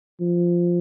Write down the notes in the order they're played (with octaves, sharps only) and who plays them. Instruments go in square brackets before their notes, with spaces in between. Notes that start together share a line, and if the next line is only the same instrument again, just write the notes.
[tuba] F3